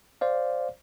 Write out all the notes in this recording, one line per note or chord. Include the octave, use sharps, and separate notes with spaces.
C5 D5 F5